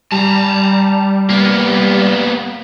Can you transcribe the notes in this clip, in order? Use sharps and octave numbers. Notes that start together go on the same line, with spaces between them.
G3 A5 A#5
A#3 B3